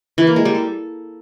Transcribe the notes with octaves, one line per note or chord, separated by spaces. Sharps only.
E3
A#3
G#3
G3
A4